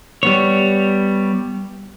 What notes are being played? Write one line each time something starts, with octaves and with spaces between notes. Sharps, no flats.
G3 B3 C#5